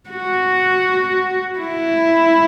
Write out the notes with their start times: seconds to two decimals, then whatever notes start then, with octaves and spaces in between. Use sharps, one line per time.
0.10 F#4
1.59 E4